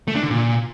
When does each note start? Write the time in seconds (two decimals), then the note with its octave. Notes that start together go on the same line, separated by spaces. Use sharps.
0.08 A3
0.15 D4
0.23 D3
0.31 A#2